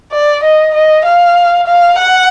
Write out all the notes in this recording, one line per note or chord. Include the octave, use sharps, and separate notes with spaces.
D5
D#5
D#5
F5
F5
F#5